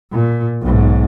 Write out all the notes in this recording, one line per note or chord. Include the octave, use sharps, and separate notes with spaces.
A#2
B1 G#2